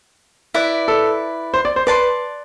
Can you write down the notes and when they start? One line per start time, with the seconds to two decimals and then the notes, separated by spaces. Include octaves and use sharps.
0.54 E4 B4 D5
0.88 A4
1.54 C5
1.65 D5
1.76 C5
1.87 B4 D5 A5 C6